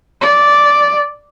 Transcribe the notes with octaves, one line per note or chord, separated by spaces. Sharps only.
D5